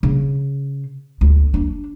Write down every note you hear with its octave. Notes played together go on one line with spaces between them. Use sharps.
C#3
D2
D4